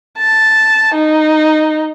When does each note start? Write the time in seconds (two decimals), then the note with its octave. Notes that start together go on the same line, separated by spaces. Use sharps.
0.18 A5
0.95 D#4